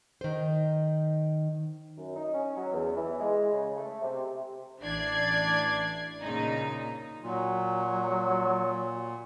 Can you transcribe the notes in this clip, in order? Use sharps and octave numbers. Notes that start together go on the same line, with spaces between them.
D#3 C5
F#2
D#4
C#4
F#3
E2
E3
G#3
C#3
A3
C3
A1 E3 D4 D5 G#6 C7
A#2 C#3 D#4
A#2 F#3